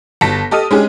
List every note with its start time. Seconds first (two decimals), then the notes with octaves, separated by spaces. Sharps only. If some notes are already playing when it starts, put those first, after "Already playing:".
0.21 G1 A5 A#6 B6
0.51 G4 A4 D#5 D#6 F6 D#7
0.71 G#3 C#4 D4 G4 G#4